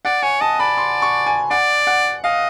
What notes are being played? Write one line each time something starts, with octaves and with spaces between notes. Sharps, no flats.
D5 F#5
C#5 G#5
D#5 A5
D5 B5
C6
C#6
G#5
D5 F#5
F#5
D#5 F5